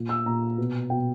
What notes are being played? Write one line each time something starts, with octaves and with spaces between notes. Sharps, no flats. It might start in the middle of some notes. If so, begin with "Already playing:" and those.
Already playing: A#2
E6
A#2 A#5
B2
B2 G5